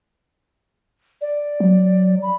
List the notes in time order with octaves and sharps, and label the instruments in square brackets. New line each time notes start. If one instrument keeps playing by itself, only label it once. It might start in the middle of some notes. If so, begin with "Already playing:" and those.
[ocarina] D5
[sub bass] F#3
[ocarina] B5